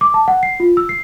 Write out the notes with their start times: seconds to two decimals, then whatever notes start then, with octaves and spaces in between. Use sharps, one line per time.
0.01 D6
0.14 A5
0.28 F#5
0.43 C7
0.60 F4
0.77 E6
0.89 C7